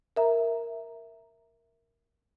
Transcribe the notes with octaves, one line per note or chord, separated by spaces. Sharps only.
A#4 E5 A#5